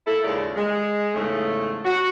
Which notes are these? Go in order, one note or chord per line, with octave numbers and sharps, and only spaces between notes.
A#3 E4 A4
D#2 G#2 C#3 F4 A#4 D5
G#3
E2 G#2 C#3 A3
F#4